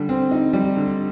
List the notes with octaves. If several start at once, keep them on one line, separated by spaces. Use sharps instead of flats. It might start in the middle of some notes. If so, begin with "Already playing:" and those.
Already playing: D3 G3
C4
D#4
G3
D3